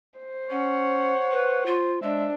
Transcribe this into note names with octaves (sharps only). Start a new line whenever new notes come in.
C5
C#4 C#5 F#5
B4
F4
G#3 D4 E5